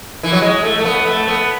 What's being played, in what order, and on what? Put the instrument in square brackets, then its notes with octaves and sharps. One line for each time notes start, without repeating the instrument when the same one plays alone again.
[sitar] E3
F#3
G#3
A3
A3
B3
A3
B3